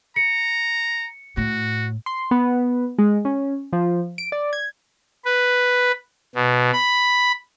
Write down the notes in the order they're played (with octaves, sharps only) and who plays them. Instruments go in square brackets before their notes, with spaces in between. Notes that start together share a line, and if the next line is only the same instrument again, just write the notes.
[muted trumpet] A#5 [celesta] C#7
[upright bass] A2 [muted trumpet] F#4
[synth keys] C6
B3
G#3
C#4
F3
D7
D5
G#6
[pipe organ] B4
B2
B5